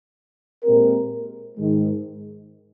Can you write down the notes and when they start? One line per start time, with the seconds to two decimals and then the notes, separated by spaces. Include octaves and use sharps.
0.64 A#2 G#3 C4 G4 A#4
1.58 G#2 D#3 G#3